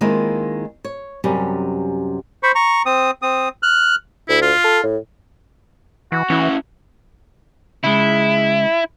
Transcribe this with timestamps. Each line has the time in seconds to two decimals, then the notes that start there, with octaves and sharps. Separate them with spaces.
0.01 D#3 G#3 A#3 C4 E4 F4
0.85 C#5
1.24 F#2 C3 G3 C#4
2.43 C5 B5 C#6
2.55 A#5 C#6
2.86 C4 D#6
3.22 C4 D#6
3.63 F6 F#6
4.29 D2 E4
4.42 F4
4.64 A4
4.83 A2
6.12 E3 F#4
6.30 E3 C#4 E4
7.84 C#3 G#3 E4